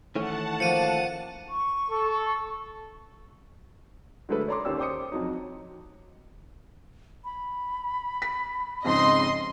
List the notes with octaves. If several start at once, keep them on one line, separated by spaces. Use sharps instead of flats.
D#3 E3 A3 C#4 F#5 A5
F3 A#3 C#7 D#7
C#6
A4
D3 F#3 G#3 A3 A4 B4
C#5 D5 A#5 C6 D6
D#2 C#4 G4 D5 E6
C5 G5 D6 D#6 C#7
F2 F#3 D#4
B5
B6
F2 G#2 C#3 D#5 C6